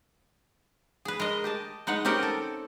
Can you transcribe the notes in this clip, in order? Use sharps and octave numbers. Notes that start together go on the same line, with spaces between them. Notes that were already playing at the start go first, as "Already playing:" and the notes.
G#4 B4
G#3 A#4 D#5
G4 D#5 A5
G#3 D#4 B4 F#5
C4 C#4 G4 A#4 D#5 F#5
A4